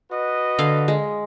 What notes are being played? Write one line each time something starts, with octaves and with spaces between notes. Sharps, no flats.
F#4 B4 D#5
D3 F5
G#3